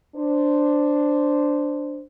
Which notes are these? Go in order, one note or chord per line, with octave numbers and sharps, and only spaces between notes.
D4 C5